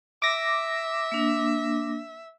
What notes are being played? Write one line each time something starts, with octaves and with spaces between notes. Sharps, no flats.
E5 D6 A#6
A#3 D4